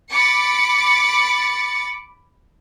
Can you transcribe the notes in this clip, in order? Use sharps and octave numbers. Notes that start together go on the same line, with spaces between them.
B5 D6 A6 C#7